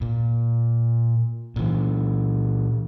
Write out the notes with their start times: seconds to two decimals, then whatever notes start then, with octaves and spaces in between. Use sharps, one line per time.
0.01 A#2
1.56 A#2 E3